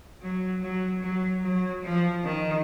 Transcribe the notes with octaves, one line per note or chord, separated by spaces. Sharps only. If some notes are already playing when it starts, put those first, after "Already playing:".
F#3
F#3
F#3
F#3
F3
D#3